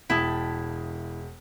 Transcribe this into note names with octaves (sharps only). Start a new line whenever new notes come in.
E1 E4 G5 A5 D#6